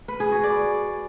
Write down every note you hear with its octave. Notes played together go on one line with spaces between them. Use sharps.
B4
G#4
F#4
D5